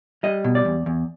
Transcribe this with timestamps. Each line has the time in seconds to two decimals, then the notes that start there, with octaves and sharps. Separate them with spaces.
0.23 G3 D#5
0.44 B2
0.55 D5
0.65 E2
0.86 E2